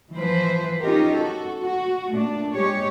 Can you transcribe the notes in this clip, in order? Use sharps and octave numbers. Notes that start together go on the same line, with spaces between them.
E3 F3 B4 C5
C#4 D#4 F4 G4 A#4
F#4 A4
F#4
A#2 A3 D4
G#3 G4 C#5